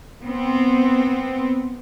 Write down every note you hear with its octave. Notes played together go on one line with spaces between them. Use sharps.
B3 C4